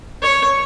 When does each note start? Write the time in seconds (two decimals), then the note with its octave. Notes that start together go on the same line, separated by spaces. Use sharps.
0.22 C#5